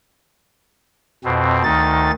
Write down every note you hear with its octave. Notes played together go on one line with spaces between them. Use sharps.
F2 B2 C4
D2 D#3 D#4 A6